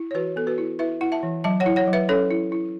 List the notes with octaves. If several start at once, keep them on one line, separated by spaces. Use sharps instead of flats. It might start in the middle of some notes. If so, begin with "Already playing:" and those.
Already playing: E4
C#5
E3 F#4 B4
B3 A4
F#4 B4
E4
E4 B4 E5
E4 F#5
E5 A5
E3
F#3 E5 A5
C#5 F#5
E4
C#5 F#5
F#3
B4 E5
C#4 A4 C#5
E4
E4